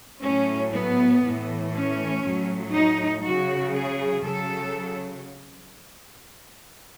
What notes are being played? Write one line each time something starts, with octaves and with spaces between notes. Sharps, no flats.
A2 F#3 C#4
B3
A2 E3
C#4
A2 F#3
D#4
C#3 F#3 F#4
G#4
C#3 F#3 A4